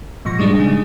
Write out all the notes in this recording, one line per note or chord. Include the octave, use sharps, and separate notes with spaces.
G#2 B2 F3 C#6 A#6
G3 G#3 D4 D#4
C#3 G#3